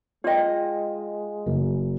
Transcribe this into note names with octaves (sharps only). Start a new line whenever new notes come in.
G#3 F4 D5 D#5 G5
F#1